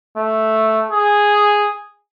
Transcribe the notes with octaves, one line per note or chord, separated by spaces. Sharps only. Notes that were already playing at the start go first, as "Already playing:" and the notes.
A3
G#4